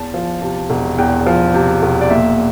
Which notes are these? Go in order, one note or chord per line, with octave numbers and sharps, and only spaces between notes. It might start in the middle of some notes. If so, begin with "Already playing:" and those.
Already playing: E2 A5
F3
C3
E1
E2 G5
F3
C3
E1
D5
A#2 E5